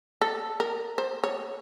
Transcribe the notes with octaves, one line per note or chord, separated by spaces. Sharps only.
A4
A#4
C5
C#5